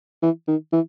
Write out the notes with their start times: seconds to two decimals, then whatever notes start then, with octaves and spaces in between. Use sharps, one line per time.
0.22 E3
0.48 D#3
0.72 E3